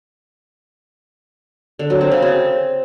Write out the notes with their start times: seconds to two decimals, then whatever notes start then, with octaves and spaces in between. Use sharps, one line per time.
1.79 D3
1.90 F#3
2.01 C4
2.12 C#3
2.22 C4